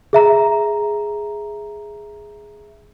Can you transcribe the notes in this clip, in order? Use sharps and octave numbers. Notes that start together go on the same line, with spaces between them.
G#4 E5 A#5